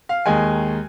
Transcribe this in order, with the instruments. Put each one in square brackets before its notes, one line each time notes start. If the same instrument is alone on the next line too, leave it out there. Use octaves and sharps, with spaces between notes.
[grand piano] F5
D#2 D#3 G#3 G#5